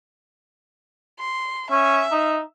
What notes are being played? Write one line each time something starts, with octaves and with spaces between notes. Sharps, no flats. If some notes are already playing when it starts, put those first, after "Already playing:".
C6
C#4 E5
D#4